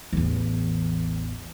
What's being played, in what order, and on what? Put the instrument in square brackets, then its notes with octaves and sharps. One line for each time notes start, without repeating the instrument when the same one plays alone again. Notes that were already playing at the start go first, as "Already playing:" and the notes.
[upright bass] A1 E2